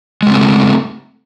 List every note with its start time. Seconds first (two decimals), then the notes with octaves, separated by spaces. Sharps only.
0.23 G#3
0.26 C#3
0.30 C4
0.34 A3